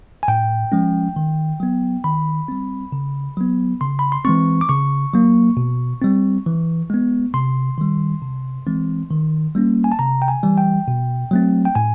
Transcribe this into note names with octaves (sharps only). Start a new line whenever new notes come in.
G#5
A2 G5
F3 G#3 C#4
D#3
F#3 B3
D#3 B5
G3 C4
C#3
F#3 B3
C#3 C6
B5
C6
E3 G#3 C4 C#6
D6
C#3 C#6
F#3 A#3
B2
G3 C4
E3
G#3 B3
C3 C6
D#3 G3
C3
E3 G#3 C4
D#3
G3 A#3 C#4
G#5
A5
C3 A#5
G5
G#5
E3 G3
G5
B2
F#3 A3 C4
G5
A2 G#5